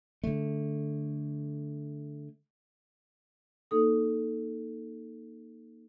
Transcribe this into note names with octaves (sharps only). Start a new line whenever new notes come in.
D3 A3
A#3 D#4 A4 D#6